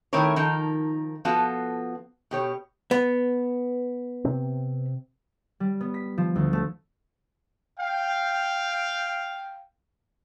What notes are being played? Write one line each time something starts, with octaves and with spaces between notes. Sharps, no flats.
D#3 A3 C4 E4 A#4 C#5
D#3 F3 D#4 A#4
F3 B3 F4 F#4 A4
B2 G4 C#5
B3
C3 C4
G3
B3
B6
F3
D2
A3
F5 G5